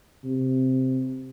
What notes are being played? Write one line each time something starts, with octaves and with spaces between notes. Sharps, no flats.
C3